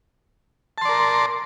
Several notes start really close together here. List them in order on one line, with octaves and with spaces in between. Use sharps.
A5 C6 D5 A#4